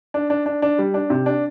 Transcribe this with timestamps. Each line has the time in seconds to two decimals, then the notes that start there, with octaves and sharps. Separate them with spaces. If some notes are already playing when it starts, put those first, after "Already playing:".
0.14 D4
0.30 D4
0.46 D4
0.62 D4
0.79 G3
0.94 D4
1.10 C3
1.26 D4